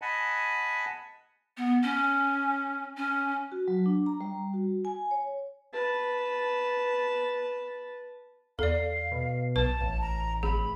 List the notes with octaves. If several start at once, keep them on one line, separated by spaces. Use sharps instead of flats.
D#5 F#5 G#5 A5 B5
B3
C#4
C#4
F#4
F#3
D4
A#5
G3
F#4
G#5
C#5
B4 A5
E2 A4 D5 F5
B2
B1 B4 A5
A1
A#5
G#1 G#4 B5